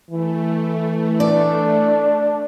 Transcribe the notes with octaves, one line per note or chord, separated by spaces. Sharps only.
E3 A3
D4 D5